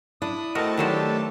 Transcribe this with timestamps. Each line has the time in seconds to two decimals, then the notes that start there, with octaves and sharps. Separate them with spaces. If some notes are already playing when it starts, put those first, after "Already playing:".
0.22 D4 E4 D#6
0.55 A3 C4 F#4 A#4 D#5 A5
0.77 D#3 F#3 D4 G4 A4 C5